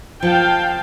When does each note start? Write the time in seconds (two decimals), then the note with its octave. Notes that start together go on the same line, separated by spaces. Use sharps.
0.23 F3 F5 G5 A5